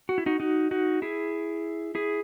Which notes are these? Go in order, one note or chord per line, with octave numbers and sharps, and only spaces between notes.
F#4
E4
D#4 F#4
D#4 F#4
D#4 F#4
E4 G#4
E4 G#4